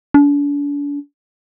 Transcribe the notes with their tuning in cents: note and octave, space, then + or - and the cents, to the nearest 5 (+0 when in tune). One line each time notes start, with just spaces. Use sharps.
D4 -40